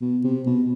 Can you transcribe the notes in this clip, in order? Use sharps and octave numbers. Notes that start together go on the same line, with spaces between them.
B2
C3
B2